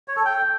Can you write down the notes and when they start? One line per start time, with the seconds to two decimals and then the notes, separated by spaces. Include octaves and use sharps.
0.08 C#5
0.17 A4
0.25 G5